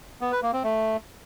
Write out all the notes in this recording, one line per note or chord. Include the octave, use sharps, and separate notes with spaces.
B3
B4
A#3
C4
A3